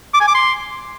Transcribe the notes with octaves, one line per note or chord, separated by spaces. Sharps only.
D6
G#5
D6
C6